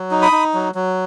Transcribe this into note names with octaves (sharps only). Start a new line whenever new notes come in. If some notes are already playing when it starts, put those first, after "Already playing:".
Already playing: F#3
D#4
B5 D#6
D#4
F#3
F#3